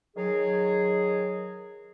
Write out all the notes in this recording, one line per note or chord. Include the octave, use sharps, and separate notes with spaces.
D#3 F#3 G#4